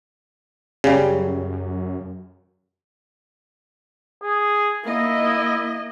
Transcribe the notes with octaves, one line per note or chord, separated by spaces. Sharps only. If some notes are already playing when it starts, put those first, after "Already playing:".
F#2 C#3 G3
G#4
A#3 E4 D#5